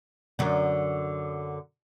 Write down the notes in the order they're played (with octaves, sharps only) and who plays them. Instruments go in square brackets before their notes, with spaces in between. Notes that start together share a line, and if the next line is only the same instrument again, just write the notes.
[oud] F#2 D3